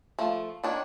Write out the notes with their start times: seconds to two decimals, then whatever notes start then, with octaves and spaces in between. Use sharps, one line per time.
0.19 F3 A3
0.64 D#3 D4 C#5